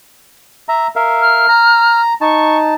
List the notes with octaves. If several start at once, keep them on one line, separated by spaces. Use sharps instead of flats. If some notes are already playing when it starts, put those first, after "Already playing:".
E5 A#5
A#4 E5 F5
F6
A#5
D#4 A5 C#6